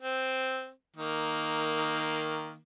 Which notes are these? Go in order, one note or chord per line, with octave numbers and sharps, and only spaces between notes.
C4
D#3 A#3